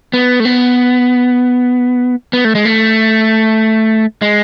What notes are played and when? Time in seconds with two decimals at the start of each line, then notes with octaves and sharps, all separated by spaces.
0.13 B3
0.40 A3
0.45 B3
2.33 B3
2.45 A3
2.55 G#3
2.65 A3
4.22 G#3